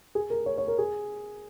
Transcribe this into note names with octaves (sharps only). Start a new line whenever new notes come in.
G#4
A#4
C#5
C#5
A#4
G#4